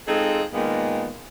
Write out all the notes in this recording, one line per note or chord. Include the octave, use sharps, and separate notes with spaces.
G#3 C4 D#4 F4 G#4 A4
A#2 D#3 G#3 A#3 B3